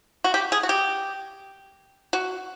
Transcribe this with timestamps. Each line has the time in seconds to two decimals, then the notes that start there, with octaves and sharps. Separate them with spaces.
0.24 F#4
0.34 G4
0.52 G#4
0.63 F#4
0.69 G4
2.13 F#4